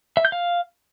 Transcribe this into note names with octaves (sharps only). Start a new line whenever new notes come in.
E5
G6
F5